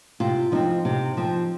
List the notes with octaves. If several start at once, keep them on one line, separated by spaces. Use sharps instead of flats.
C3 F4
F3 C4 D#4
C3
F3 C4